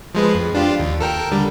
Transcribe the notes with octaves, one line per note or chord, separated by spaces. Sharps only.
F3 G#3 B4
F2
D4 F4 G4
D#2
A4 A#4 G5
D3 G3